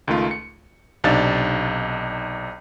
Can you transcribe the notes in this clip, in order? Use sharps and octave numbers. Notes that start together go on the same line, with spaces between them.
C#2 D#3 A3 F4
C#7
B1 C3 D4 D#4 F5 A6